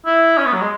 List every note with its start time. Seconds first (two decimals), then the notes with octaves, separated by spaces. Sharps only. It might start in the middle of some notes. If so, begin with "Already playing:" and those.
0.06 E4
0.38 C#4
0.46 B3
0.54 F#3
0.61 G#3